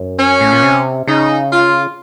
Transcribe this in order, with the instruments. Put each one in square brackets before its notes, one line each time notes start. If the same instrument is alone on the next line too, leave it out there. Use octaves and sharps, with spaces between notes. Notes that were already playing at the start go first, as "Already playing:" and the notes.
Already playing: [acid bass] F#2
[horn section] C#4
[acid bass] A2
A#2
C3
[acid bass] C#3 [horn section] D#4
[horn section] F4